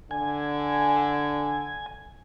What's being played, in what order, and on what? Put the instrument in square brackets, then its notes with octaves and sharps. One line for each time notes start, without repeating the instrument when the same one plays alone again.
[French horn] D3 [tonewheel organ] G#5